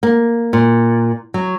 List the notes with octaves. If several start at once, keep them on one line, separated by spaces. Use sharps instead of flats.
A#3
A#2
F#3